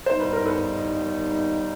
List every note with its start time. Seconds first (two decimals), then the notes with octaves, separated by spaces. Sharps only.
0.06 D#2 D#3 G3 B3 D#4 C5
0.20 B4
0.33 A#4
0.46 A4 B4